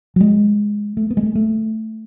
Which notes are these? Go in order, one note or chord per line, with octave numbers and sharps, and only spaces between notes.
F#3
G#3
A3
B3
G#3
A3
A3